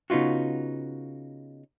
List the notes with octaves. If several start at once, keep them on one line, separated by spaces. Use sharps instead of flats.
C#3 B3 D#4 F4 F#4